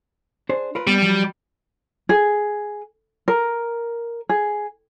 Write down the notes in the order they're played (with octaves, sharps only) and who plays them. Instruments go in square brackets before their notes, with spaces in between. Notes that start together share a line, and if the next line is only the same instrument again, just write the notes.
[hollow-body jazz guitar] D4 G#4 C5
F4 A#4 B4
[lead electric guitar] G3 [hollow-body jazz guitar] B3
[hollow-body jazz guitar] F3 F#3
[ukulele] G#4
A#4
G#4